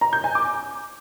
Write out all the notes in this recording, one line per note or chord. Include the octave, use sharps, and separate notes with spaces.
A#5
G6
G#5
D6